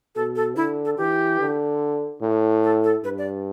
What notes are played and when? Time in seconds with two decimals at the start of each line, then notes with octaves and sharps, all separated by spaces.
0.15 B2 A4
0.36 A4
0.56 D3 E4
0.85 A4
0.97 E3 G4
1.39 D3
2.21 A2
2.63 A4
2.84 A4
3.04 G2 B4
3.18 D5